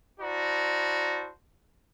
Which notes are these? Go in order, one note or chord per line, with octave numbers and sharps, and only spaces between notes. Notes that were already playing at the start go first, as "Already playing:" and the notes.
E4 F#4 C5 D5 A5 A#5